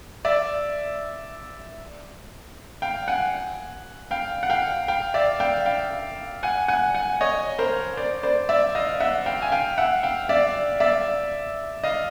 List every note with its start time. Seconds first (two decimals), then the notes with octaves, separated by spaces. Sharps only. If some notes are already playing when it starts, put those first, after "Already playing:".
0.25 D5 E5
2.82 F5 G5
3.08 F#5 G#5
4.11 F5 G5
4.43 F#5
4.50 F5 G5
4.88 F5 G5
5.14 D5 E5
5.40 F5 G5
5.65 F5 G5
6.43 F#5 G#5
6.68 F#5 G#5
6.95 F#5 G#5
7.21 C#5 D#5
7.58 A#4 C5
7.97 C5 D5
8.23 C5 D5
8.49 D5 E5
8.75 D#5 F5
9.00 E5 F#5
9.26 F5 G5
9.42 G#5
9.51 F5 G5
9.78 E5 F#5
10.03 F5 G5
10.29 D5 E5
10.80 D5 E5
11.84 D#5 F5